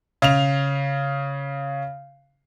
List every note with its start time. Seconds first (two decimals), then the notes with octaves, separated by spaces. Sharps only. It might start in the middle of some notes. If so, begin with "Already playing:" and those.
0.22 C#3 F7